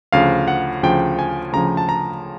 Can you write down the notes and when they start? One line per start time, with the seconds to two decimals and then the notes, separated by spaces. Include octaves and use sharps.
0.12 D2 C#3 F3 F5
0.48 F#5
0.83 D2 C#3 F3 G5
1.19 G#5
1.52 D2 C#3 F3 A#5
1.77 A5
1.89 A#5